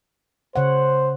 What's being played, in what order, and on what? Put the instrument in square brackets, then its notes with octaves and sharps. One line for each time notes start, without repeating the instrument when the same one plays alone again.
[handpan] C#3 C#5 F#5 [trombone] C5